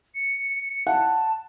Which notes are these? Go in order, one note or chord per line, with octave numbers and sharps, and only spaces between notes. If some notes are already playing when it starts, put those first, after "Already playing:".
C#7
F#5 A5